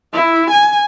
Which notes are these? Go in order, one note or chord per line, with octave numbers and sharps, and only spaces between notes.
E4
G#5